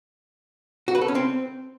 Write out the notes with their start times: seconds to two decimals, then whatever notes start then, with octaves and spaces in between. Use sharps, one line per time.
0.88 F#4
0.95 B4
1.02 A4
1.08 C#4
1.15 C4